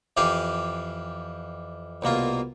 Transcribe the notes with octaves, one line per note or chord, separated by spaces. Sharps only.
F2 E3 G4 F5 G#5 D6
C2 B2 A#3 F4